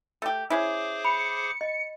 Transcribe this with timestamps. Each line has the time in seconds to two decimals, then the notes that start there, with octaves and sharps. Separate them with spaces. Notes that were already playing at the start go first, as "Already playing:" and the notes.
0.22 A3 G4
0.50 C#4 E4 G#4 C5 D6
1.05 B5 C#7
1.61 D#5